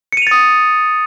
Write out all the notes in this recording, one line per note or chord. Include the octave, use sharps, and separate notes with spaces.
D#6 A6 C#7 D#7 F7